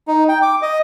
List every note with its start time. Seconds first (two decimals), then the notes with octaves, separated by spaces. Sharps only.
0.07 D#4
0.28 G5
0.42 D6
0.62 D#5